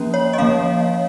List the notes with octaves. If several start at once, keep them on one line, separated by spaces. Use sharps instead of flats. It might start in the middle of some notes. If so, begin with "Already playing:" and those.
Already playing: F3 A#3 C#4
C#5
D#5
F3 A#3 C#4 F5